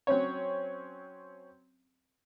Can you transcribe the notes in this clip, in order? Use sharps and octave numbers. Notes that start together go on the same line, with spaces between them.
F#3 C4 C#4 C#5